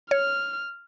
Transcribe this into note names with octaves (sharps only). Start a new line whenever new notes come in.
C#5 F6